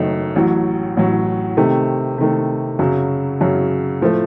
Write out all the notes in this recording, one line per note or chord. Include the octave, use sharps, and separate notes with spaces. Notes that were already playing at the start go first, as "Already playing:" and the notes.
Already playing: F#1 F#2 D#3 A3 D#4
A1 A2 F#3
A1 A2 F#3
C3 D#3 A3
C3 D#3 A3
F#2 C#3 F#3
F#2 C#3 F#3
A2 F3 A3